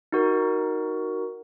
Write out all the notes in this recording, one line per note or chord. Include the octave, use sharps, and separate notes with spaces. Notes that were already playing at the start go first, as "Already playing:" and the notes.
D#4 F#4 A#4